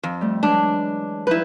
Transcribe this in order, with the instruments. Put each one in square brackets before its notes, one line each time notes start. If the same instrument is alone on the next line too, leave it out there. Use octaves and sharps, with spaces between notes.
[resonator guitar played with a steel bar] F2
[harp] G3 A3
[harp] E3 F#3 G#3 [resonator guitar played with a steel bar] D4
[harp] G2 F3 D#4 [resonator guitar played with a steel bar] E4 B4